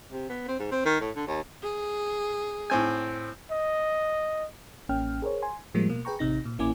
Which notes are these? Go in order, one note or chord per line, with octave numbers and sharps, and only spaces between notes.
C3
B3
C4
G#2
C4
D#3
A2
D3
D#2
G#4
A2 C4 G#5
D#5
A1 A#3 C#4 G5 F6
G#4 A#4 C5 C#5
G#5 C6
A2 F3 G3 G#3 A#3
B2 A#3
G#4 B4 G5 A#5 C#6
A1 C3 D#4 A#6
A#2
A1 A#3 C#4 E4 G#5 D6